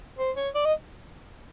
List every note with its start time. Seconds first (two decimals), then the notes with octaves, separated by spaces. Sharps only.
0.18 C5
0.36 C#5
0.55 D5
0.65 D#5